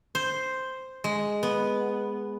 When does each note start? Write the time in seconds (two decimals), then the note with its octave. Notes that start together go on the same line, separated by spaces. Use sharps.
0.15 C5
1.04 G#3
1.43 B3